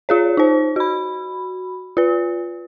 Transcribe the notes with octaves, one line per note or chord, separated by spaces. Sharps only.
F4 G#4 C#5
D#4 C5
F#4 B5
F4 B4